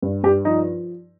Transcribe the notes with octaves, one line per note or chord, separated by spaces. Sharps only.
G2
G2 G4
F3 D#4